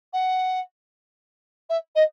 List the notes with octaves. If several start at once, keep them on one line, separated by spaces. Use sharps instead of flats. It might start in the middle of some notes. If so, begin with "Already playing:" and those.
F#5
E5
D#5